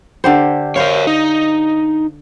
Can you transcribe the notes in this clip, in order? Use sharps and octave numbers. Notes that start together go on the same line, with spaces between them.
D3 G4 C5
A#4 C5 C#5 F5
D#4